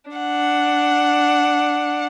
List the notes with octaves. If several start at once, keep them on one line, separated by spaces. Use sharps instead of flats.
D4 F#5